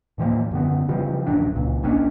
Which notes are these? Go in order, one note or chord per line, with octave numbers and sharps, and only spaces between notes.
A2 E3 F3 A#3
F#2 D3 B3
C#3 E3 F3 G3
D1 A#1 F#2 D4
C#2 A#2
A#1 A#3 C#4 D4